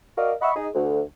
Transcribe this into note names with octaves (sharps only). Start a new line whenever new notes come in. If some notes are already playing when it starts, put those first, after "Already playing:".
F#4 A#4 D5 D#5 F5
D#5 E5 F#5 B5 C#6
D#4 G#4
D2